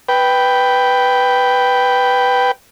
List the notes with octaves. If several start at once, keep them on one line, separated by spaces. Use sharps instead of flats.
B4 G5